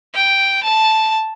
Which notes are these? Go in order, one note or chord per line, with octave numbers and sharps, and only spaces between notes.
G5
A5